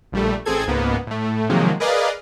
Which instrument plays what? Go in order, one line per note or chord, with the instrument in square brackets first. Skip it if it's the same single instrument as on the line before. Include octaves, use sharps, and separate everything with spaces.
[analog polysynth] A#1 G3 A3
A1 C4 G#4 A4 G#6
C#2 G#2 A#3 B3
A2 A3
C3 D#3 F3 F#3 G#3 A#3
G#4 A#4 B4 D5 D#5 F5